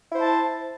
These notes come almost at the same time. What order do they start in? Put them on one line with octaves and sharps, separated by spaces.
E4 C5 A5